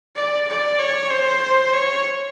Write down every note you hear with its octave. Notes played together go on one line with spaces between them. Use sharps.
D5
D5
C#5
C5
C#5